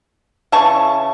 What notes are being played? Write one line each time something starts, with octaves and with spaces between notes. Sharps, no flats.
C#3 E3 A5 C#6